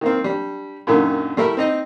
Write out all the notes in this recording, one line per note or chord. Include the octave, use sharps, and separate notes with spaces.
D#3 A#3 C4
G3 D4
F#2 A#2 D3 D#3
G3 A3 E4 A#4
C4 D#4 D#5